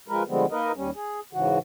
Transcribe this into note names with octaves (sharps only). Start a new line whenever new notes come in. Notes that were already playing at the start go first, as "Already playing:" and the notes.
F3 G#3 A#4 B4
D3 F3 G3 G#3 B3 C4
A#3 D#4 A#4 B4 D#5
D#2 G3 C#4
G#4
G#2 C#3 E3 F#4